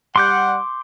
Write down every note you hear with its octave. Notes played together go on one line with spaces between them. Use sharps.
G3 F#5 C6 D6 G6